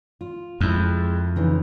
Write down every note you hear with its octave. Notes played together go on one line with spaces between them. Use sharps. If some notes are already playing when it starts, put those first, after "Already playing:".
F4
F2 G#3 E4
C#3 E3 D#4